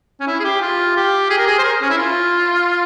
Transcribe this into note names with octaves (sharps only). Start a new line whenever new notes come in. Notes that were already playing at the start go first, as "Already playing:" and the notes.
C#4
E4
G#4
G4
F4
G4
G#4
A#4
G#4
C5
A#4
C#4
E4
F4